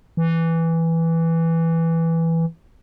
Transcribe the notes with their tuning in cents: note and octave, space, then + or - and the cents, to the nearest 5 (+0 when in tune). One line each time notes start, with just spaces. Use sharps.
E3 +0